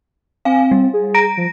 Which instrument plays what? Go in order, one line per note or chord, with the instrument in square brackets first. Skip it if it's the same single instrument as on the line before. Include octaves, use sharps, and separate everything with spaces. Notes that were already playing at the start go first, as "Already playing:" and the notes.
[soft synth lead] C4 [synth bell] F5 G#5
[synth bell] G3
[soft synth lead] G#4
[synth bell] A#5 A#6 D7
[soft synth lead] F3